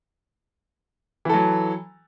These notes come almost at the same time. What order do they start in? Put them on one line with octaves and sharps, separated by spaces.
E3 A4 F#3